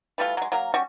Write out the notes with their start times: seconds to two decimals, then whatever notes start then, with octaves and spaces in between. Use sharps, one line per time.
0.18 E3 G3 A3 F4
0.37 F#3 G#3
0.52 F#3 A#3 A#4
0.74 G3 C#4 F#4 C#6